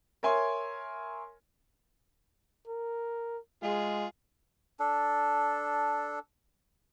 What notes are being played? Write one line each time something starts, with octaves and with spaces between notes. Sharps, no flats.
A#4 C#5 E5 G#5 C6
A#4
G#3 F4 G#4
D4 A4